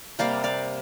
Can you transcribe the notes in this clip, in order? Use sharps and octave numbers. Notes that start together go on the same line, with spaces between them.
C3 G3 A#3 D5 F5
D5 F5